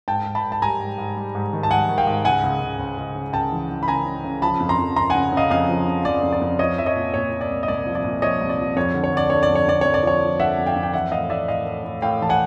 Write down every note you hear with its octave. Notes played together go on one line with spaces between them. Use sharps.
G#2 G5 A5
G#2
A5 B5
G#2
A5
G3 G#5 A#5
G#2
G#2
G3
G#2
D#3
A5
G#2 F#5 G#5
D#3
F5 G5
G#2
C#2 F#5 G#5
C#2
C#2
C#2
C#2
C#3
C#2 G5 A5
E3
E3
B5
C#3 G#5 A#5
C#3
C#3
F3 A5 B5
F2
A#5 C6
F2
F2 A#5 C6
C#3 F#5 G#5
C#3 D#5 F5
F2 D#5 F5
F3
C#3
F2 D5
F2
D5
F2
F3 C#5 D#5
F3 E5
C#5 D#5
A#2
A#2 C#5
A#2
D5
C2
D#5
C2 D5
F3
D5
A#2
F3 C#5 D#5
C2
D5
F3
F2 C#5
D3
C#5
D3 D5
D3 C#5
D5
F2
C#5
F2 D5
F2 C#5
D5
F3 C#5
F3
D3 E5 F#5
F2
F5 G5
F2
G5
E3 E5 F#5
A2 D#5 F5
A2 D5 E5
A2 D#5 F5
A2
A2
A2 F5 G5
E3 A5
F#5 G#5